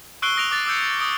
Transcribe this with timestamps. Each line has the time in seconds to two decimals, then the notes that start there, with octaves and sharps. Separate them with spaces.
0.22 C#6 E6 F#6 C7 D7 G7
0.37 D#6 A#6 D7 F7
0.51 D6 F#6 A6 F7
0.66 D6 E6 G6 C#7
0.83 F7
0.99 D#6 D7